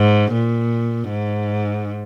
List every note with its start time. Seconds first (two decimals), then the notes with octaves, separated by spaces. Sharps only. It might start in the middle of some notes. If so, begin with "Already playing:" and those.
Already playing: G#2
0.32 A#2
1.09 G#2